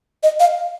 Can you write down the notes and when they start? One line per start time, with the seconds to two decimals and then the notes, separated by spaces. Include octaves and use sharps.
0.23 D#5
0.40 F5